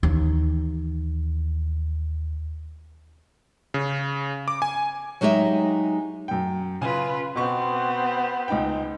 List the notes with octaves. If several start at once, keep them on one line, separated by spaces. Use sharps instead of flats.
D#2 E3
C#3
D6
G#5
F#3 G#3 D#4 G4 E5
F#2 G5
C#3 F4 B4 G#5
B2 B3 C4 C#6
C#2 D#4 G5